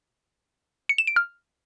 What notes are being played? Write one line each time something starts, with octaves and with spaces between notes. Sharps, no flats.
C#7
E7
D7
F6